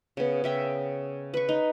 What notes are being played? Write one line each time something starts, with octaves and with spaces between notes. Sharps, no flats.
C#3 B3
C#3 E5 G5
B4 C#6
D#4